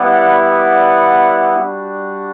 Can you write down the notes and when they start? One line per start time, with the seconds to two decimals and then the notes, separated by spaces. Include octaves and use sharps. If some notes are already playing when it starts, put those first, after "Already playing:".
Already playing: G3 B3 E4 D5 F#5
0.46 D5 F#5
1.54 G3 D4 F#4